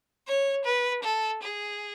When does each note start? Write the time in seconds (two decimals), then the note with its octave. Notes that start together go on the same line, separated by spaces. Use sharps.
0.27 C#5
0.65 B4
1.04 A4
1.43 G#4